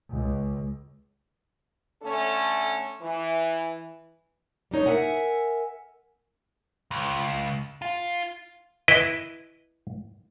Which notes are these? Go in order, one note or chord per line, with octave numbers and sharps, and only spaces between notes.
C#2
D3 A3 C#4 A4
E3
G3 D4 D#4 C#5
A#4 E5 F#5 G#5
C#2
F4
E4 B4 D#5